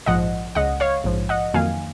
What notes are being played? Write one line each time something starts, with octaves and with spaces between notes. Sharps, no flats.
A#1 G#2 F3 D#5 F#5
C#2 C#3 G#3 D#5 F#5
C#5 F5
A#1 G#2 F3
D#5 F#5
F2 D#3 F#3 A#3 F5 G#5